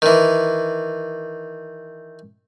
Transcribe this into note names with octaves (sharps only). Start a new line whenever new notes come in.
D#3 E3